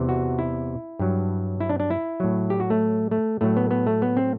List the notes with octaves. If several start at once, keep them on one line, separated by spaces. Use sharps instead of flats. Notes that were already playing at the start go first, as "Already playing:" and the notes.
Already playing: E2 C3 E3
F#4
E4
G2 F#3
E4
D4
D4
E4
A2 F#3
G4
F#4
A3
A3
A2 F#3 A3
B3
B3
A3
B3
C4